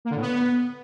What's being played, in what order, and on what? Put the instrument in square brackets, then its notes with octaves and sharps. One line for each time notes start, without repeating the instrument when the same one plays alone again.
[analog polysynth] A#3
D3
A2
B3